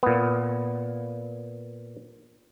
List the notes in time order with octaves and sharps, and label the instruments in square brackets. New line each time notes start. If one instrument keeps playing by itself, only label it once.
[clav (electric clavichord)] A#2 B3